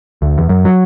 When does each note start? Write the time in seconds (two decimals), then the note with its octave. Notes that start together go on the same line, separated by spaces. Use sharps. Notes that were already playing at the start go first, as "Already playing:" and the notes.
0.22 D2
0.38 E2
0.49 F#2
0.65 F#3